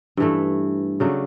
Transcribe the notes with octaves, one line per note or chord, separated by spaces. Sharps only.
G2 E3 A3
C#3 F#3 A3 D4